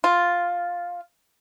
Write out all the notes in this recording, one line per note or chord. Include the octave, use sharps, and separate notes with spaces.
F4